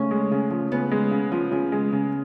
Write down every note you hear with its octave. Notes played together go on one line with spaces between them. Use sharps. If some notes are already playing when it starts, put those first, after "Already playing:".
Already playing: C#3 A3 C#4
G#3
C#3
F3
C#3 B3
G#3
C#3
F3
C#3
G#3
C#3